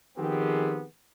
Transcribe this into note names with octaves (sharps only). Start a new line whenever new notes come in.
D#3 F3 B3 C4 G4 G#4